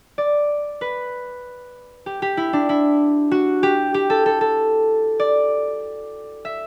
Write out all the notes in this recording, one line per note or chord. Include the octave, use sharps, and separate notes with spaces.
D5
B4
G4
G4
E4
D4
E4
F#4
G4
G4
A4
A4
A4
D5
E5